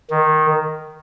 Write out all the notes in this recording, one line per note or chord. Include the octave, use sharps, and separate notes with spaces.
D#3